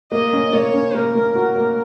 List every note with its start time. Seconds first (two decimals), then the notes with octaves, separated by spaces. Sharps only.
0.12 A#3 D#5
0.33 C#4
0.53 A#3 C#5
0.73 C#4
0.95 A#3 A#4
1.15 A#3
1.35 F#4
1.56 A#3